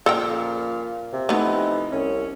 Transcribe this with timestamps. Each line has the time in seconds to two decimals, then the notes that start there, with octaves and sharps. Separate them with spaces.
0.06 A#2 C#3 F3 A4 A#4 F5 G5
1.13 C3
1.29 E3 F3 A3 B3 D#4
1.92 C2 C#4